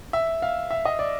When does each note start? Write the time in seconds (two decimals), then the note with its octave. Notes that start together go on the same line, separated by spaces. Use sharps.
0.13 E5
0.42 F5
0.71 E5
0.85 D#5
0.99 D5